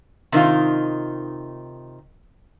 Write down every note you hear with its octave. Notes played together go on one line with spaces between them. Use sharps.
C3 D#3 D#4 F4